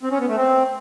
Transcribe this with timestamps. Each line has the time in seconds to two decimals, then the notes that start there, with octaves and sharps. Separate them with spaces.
0.03 C4
0.11 C#4
0.20 B3
0.28 A3
0.37 C4